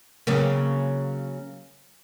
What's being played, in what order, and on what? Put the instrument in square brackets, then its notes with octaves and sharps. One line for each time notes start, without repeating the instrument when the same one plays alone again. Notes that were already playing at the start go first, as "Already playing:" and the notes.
[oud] C#3 F#3 A#3